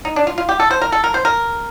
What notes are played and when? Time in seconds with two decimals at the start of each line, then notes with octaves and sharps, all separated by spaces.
0.05 D#4
0.16 D4
0.27 F4
0.38 F4
0.49 G4
0.60 A4
0.71 C5
0.82 A#4
0.92 A4
1.04 A#4
1.14 C5
1.25 A#4